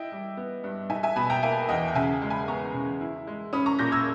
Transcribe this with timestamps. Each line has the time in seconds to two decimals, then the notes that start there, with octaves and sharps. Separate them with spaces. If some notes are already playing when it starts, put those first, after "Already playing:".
Already playing: E4 D#5 G5
0.12 G3
0.37 B3
0.64 G2
0.90 D#4 E5 G#5
1.03 E5 G#5
1.16 B2 G#5 B5
1.30 G5 A#5
1.43 A#3 E5 G#5
1.69 E2 D#5 G5
1.88 G5
1.95 C#3 E5 G#5
2.22 G#3
2.30 G#5 B5
2.48 B3 A#5 C#6
2.74 C#3
3.01 E4
3.27 G#3
3.53 C#4 B5 D#6
3.66 A#5 C#6
3.79 A#2 G6 A#6
3.92 E6 G#6